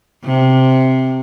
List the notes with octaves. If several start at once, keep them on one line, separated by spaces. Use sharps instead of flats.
C3